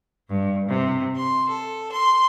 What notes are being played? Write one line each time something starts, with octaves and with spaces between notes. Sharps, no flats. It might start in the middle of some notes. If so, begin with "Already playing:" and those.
G2
C3
C6
A4
C6